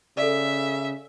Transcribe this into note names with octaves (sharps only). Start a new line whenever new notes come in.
C#3 A4 D5 E5